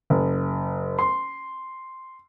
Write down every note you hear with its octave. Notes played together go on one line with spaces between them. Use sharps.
F#1
C6